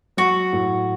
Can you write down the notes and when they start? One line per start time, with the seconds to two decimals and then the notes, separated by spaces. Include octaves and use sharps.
0.17 F#3 F#4
0.53 A2